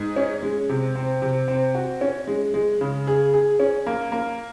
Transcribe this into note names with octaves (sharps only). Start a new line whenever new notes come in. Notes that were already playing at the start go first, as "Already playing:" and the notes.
Already playing: G#2
C#4
G#3
C3
C4
C3
C4
F#4
C#4
G#3
G#3
C#3
G#4
G#4
C#4
A#3
A#3